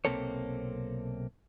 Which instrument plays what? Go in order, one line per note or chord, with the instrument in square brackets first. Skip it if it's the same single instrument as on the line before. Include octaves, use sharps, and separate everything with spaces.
[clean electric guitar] B1 C3 A#3 C4 A4 C#5